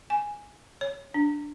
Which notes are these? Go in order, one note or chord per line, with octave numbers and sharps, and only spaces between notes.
G#5
C#5
D4